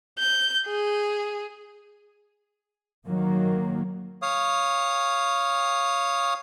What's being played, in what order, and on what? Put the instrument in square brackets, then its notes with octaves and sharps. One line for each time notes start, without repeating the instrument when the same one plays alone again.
[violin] G6
G#4
[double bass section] D#3 F#3 A#3
[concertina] C#5 F5 D#6